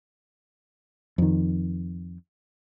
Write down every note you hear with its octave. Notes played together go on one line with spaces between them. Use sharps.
F2 D#3